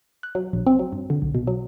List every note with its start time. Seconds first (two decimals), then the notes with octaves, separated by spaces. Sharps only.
0.23 F#6
0.35 F#3
0.53 A#1
0.67 C4
0.79 F#3
0.92 G2
1.10 D3
1.22 B1
1.35 B2
1.47 F#3